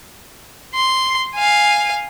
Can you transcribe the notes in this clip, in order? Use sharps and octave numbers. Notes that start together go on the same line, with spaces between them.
C6
F5 G#5